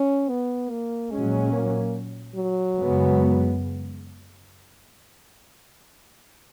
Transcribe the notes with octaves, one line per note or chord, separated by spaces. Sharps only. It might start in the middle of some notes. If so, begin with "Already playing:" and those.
Already playing: C#4
B3
A#3
A#2 F#3 G#3 C#4
A#3
F#3
F#2 C#3 G#3 B3